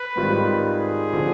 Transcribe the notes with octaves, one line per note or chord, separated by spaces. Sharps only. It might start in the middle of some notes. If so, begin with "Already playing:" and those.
Already playing: B4
G#2 D#3 G3 C4 F4
G#4
D3 F3 C4